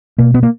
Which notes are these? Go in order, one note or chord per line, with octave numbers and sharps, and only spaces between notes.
B2 A#3
B3
A#3